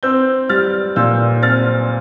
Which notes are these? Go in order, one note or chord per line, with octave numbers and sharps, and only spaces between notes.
C4 E6 G6
G3 F6 A6
A#2 E6 G6
C4 F6 A6